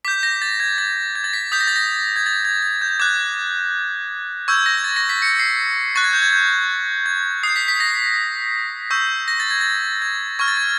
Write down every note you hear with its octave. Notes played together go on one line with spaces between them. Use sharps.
D6 G6 B6
A#6
A6
G#6
A6
G#6
A6
B6
D#6 G6 B6
A#6
A6
A#6
G#6
A6
G#6
G#6
G6
D6 F#6 G#6
C#6 E6 G6 G#6
A#6
G#6
A6
A#6
B6
C#7
C7
C#6 F#6 A6
G#6
G6
G#6
G6
G#6
D#6 G6 C7
B6
B6
A#6
C#6 E6 G6
A#6
A6
G#6
A6
G#6
C#6 F6 G#6
A6
G#6